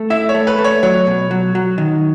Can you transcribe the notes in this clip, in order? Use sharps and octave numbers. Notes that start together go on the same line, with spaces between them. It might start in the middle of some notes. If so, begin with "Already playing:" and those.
Already playing: A3
E4 E5
C#5
A3
B4
A3
C#5
F#3 C#5
B2
F#3
F#3
D#3